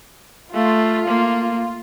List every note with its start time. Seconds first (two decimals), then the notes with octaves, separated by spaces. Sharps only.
0.54 A3 F4
1.08 A#3